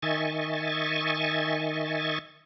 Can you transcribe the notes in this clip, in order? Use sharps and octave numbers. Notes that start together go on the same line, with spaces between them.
D#3 D#5 E5 G#5 C#6 A6